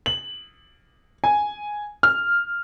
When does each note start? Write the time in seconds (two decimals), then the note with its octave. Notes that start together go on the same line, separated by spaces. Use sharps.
0.06 F#7
1.24 G#5
2.03 F6